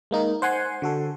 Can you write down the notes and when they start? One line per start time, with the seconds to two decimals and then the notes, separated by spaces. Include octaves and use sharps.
0.11 G#3 A#3 D#4 A#4
0.42 C5 F#5 G#5 C6
0.82 D3 F#4 A4